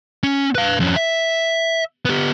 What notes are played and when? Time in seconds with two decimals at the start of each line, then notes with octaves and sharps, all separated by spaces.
0.23 C#4
0.55 B4 F5
0.80 F2 C#4
0.96 E5
2.05 B3 G4